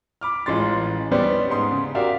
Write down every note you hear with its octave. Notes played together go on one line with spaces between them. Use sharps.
B5 D6 F6
A1 G#3 C#4 F4 C6 A6
G3 B3 C#4 B4 C5 D5
G#2 C6 D#6
C#3
F#4 G4 A#4 D5 E5 F5